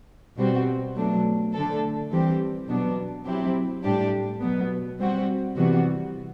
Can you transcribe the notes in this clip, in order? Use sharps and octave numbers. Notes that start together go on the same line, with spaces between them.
B2 G3 C4 F#4
B2 F#3 A3 D4
D3 A3 D4 A4
E3 G3 C4 G4
B2 F#3 B3 D4
F#3 C4 E4 G4
A2 G3 D4 G4
B2 F#3 B3
G3 C4 F#4
C3 E3 G3 B3 F#4